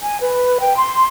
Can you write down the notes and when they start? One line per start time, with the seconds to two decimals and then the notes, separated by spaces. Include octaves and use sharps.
0.02 G#5
0.21 B4
0.60 G5
0.77 C6